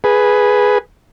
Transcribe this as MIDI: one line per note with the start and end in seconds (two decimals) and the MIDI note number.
0.04 0.78 68
0.04 0.78 71